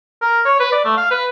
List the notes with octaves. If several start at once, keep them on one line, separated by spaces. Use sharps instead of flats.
A#4
C#5
B4
D5
A3
F5
B4